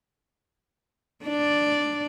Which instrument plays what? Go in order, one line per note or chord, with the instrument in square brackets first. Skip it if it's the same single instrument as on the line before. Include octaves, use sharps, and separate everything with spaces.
[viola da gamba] D4 D5